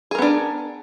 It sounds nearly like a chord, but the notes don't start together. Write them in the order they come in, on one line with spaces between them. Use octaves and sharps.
G#4 A#4 B3 D4